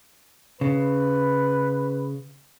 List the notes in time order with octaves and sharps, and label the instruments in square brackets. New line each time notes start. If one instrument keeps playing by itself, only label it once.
[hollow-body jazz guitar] C#3 [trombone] B4